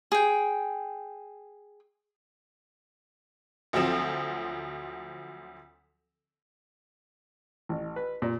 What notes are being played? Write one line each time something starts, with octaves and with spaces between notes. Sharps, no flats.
G#4 G5
D2 F3 F#3 C4 E7
A1
B4
A#2